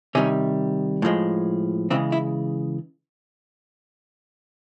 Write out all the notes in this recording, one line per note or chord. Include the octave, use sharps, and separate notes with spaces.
C3 D#3 G3 C#4
A2 F3 G#3
C#3 E3 G#3 C4
E4